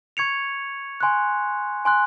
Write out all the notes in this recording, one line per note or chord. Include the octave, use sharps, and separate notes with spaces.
C#6 G#6 C#7 F7
G#5 C6 F#6
G#5 C6 F#6